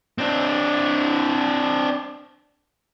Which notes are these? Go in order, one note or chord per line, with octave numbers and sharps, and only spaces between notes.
C4 D4